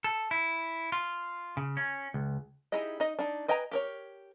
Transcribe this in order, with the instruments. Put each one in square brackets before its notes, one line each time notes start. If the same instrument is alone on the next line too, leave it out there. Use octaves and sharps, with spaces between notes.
[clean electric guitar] A4
E4
F4
C#3
C#4
C#2
[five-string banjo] D#4 E4 G4 G#4 D#5
D#4 D#5
D4 D#4
B4 D#5 G5 G#5 A#5
G4 A#4 C#5